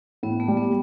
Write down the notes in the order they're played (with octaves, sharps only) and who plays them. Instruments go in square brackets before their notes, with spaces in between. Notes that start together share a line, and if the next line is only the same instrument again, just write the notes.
[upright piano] A2 [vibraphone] B3
[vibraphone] A3
[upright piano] G3
[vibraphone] B3